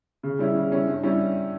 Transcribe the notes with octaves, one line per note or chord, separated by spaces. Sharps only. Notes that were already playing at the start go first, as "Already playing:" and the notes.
C#3
G3 C#4 E4
C#3
G3 C#4 E4
G2
G3 C#4 E4